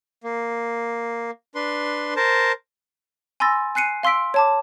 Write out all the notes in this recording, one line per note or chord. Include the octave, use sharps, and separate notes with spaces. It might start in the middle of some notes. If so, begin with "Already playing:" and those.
A#3
D4 B4 C6
A#4 C5 A5
G#5 B5 C6 E6 A6 A#6
G#5 F#6 C7 C#7 D#7
F5 C6 E6 B6 D7
C#5 A5 D6